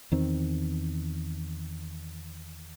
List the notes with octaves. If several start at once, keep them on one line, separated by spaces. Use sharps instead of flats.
E2 D#3 C4